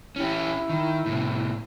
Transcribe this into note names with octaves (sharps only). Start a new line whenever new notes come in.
C#4 E4 G4
D#3
A2 C3